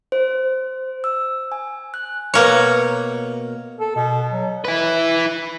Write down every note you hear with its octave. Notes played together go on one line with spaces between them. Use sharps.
C5
E6
G#5
F#6
B2 A#3 C#5
A4
B2
F#3
E4 B4